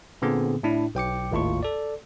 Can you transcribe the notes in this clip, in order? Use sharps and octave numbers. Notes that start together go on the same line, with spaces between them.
A#2 D3 B3 C4 G#4
A2 D4 E4
B1 G5 D6 C#7
G#1 D#2 A2 F4 C#6
A4 D5